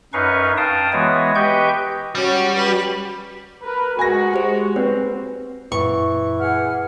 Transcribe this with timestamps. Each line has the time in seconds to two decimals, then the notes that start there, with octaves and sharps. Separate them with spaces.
0.13 F#2 C#4 D#4 B4 F5 C#6
0.57 F5 G5 A5 D#6
0.93 E3 G#3 B3 F#4 C#5
1.35 G4 B4 D#5 G5 C#6 G6
2.15 G3 C#4 F#4 C#5
2.54 B4
3.63 A#4 B4
3.99 G#3 F#4 G#5 A#6
4.34 G4 C5
4.76 C4 B4
5.72 F#2 A#2 E3 C#6
6.40 G#4 F#5 F6